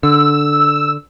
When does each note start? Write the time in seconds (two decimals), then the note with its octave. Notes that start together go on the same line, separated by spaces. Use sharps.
0.03 D3 E6